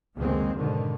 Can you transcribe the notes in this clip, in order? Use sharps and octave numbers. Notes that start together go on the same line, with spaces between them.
F1 C#2 D#3 G#3 A#3 C4
G#2 B2 D3 D#3